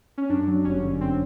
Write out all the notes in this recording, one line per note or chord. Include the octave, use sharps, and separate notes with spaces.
C#4
F#2 D4
F#3
G1 C#4
D3
C4